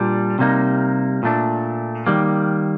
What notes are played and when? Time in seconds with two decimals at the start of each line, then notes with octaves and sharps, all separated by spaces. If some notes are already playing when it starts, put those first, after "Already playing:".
Already playing: A#2 G3 D4 F4
0.39 C3 G3 A#3 D#4
1.23 A#2 A3 D4
2.07 D#3 G3 A#3